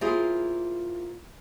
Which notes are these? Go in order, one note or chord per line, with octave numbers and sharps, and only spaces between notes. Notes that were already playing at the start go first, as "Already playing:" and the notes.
A#3 E4 F4 G#4 C5